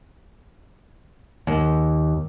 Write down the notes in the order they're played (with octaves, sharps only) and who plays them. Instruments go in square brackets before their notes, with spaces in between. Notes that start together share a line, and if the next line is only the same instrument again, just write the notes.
[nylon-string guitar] D#2